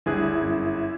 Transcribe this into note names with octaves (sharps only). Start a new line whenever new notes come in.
G1 D2 G2 G3 E4 G#4 F#6
F#2